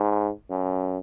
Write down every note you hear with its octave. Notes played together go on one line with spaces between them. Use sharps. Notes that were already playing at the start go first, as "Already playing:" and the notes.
Already playing: G#2
F#2